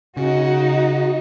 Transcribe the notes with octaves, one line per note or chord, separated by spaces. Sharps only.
C#3 D#4 F#4